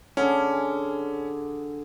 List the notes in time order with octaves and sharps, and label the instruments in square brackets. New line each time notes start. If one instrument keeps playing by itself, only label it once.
[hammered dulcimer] D3 G#4 [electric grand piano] C#4